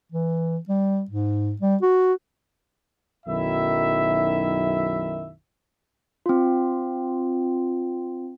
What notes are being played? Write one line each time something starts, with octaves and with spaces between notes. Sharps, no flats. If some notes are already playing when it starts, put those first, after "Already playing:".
E3
G3
G#2
G3
F#4
B1 F#2 D#3 E4 E5
C4 F4